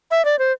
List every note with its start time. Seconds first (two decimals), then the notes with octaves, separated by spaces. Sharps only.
0.11 E5
0.25 D5
0.39 C5